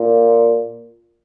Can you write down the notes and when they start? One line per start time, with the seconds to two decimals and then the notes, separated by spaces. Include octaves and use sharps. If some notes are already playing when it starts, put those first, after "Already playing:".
Already playing: A#2